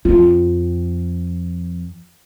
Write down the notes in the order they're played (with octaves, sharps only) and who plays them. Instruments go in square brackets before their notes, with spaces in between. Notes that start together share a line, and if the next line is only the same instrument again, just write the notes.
[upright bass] F2 [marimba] F4